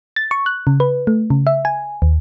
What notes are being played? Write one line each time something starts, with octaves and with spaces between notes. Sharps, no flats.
A6
C#6
F#6
C#3
B4
A3
C#3
E5
G#5
D#2